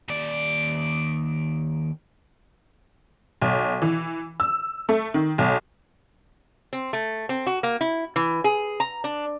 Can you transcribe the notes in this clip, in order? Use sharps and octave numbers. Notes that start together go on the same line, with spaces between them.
D#2 D5
B1
E3
E6
A3
D#3
B1
C4
A3
C4
F#4
A#3
E4
E3
G#4
A#5
D4